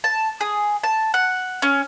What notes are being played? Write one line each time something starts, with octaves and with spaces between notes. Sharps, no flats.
A5
G#4
A5
F#5
C#4